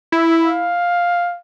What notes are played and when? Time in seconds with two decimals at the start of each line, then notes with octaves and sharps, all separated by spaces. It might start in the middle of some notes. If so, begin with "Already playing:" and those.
0.12 E4
0.43 F5